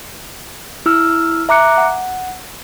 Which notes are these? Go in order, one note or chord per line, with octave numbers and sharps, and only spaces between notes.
E4 E6 F6
E5 A#5 D6 F#6 C#7
F#5